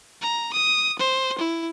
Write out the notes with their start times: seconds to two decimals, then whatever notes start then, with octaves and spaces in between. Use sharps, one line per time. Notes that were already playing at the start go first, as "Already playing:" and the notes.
0.21 A#5
0.53 D#6
0.99 C5
1.38 E4